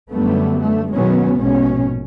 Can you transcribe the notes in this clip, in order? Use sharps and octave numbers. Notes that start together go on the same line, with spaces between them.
F#2 D3 G3 A3 B3
A3
B2 D#3 F#3 G#3 B3 C#4
A#1 G#2 B2 C#4